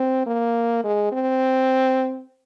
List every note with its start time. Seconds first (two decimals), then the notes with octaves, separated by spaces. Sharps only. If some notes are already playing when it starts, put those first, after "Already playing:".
Already playing: C4
0.26 A#3
0.84 G#3
1.12 C4